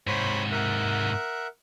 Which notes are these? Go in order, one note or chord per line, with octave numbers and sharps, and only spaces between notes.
G#2 C3 C5 C#5 B5
A#4 E5 F#5